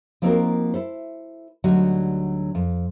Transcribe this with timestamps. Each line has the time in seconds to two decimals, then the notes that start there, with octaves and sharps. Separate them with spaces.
0.22 F3 A#3 C4 D#4 F#4 A#4
0.74 E4 A4 C5
1.64 D2 D3 F#3 G3 D#4 F#4
2.55 F2